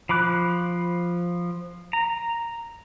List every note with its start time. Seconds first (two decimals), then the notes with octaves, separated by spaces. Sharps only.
0.09 F3 B5 D6 F#6
1.93 A#5